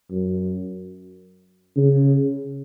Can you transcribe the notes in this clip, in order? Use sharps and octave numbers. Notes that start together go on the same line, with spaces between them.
F#2
C#3